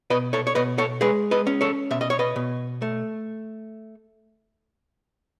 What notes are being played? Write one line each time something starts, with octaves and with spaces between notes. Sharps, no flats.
B2 B4 D#5
A4 C#5
C#5
B2 B4 D#5
A4 C#5
G#3 G#4 B4
B4 D#5
C#4
A4 C#5
B2 E5
D#5
C#5
B4 D#5
B2
A3